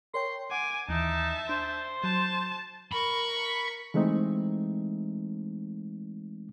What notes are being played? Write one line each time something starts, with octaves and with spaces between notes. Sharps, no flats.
A#4 C#5 G5 C6
F#5 G#5 D6
D#2 E3 D#4 E5 A5
D4 C5
F#3 A5
A#4 B5 C#6
E3 G#3 A3 C4 D#4